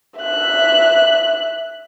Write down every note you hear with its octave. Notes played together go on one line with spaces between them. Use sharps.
E5 F#6